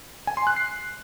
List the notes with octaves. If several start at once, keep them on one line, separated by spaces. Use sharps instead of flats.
G#5
C6
F#6
C7